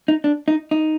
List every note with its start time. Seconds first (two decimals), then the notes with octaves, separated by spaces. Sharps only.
0.08 D#4
0.24 D4
0.48 D#4
0.71 D#4